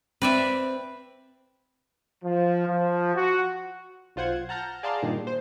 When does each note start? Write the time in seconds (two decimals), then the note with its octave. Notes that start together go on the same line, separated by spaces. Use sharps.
0.22 C4 B4 D5 E5
2.24 F3
2.67 F3
3.15 F#4
4.16 B1 F4 C5 F#5 G#6
4.49 F#5 A5 A#5 F6 G6 A#6
4.83 G#4 D5 F5 A5 A#5 C6
5.02 G2 A#2 D#3
5.27 C5